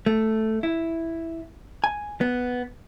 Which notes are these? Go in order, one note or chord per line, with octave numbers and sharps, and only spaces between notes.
A3
E4
G#5
B3